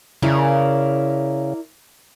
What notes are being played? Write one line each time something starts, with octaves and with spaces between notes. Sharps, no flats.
C#3 E4 A#4 D5